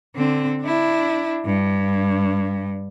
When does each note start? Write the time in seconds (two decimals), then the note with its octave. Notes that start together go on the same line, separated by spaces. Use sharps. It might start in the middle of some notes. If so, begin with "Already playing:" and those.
0.15 D3 C4
0.61 D4 E4
1.45 G2